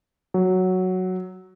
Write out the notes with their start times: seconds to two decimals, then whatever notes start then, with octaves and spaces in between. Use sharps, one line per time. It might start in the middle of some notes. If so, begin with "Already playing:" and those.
0.34 F#3